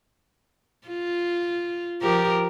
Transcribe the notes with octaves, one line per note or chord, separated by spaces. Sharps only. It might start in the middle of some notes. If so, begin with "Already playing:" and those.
F4
F3 G4 A#4